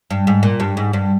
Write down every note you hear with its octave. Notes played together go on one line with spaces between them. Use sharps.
G2
G#2
A#2
G2
G#2
G2